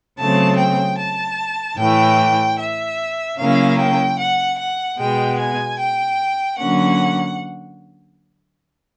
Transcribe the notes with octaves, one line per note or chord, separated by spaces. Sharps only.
C#3 F#3 A3 C4 A5
G5
A5
A2 E3 A3 G5
E5
C#3 F#3 A#3 C#4 E4 F5
G5
F#5
F#5
B2 G#3 B3 G5
G#5
G5
D3 F#3 A#3 C#4 F#5